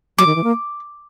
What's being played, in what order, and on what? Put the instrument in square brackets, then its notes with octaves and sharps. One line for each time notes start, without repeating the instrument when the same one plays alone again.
[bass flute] F#3 [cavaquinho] D6
[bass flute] D#3
E3
A#3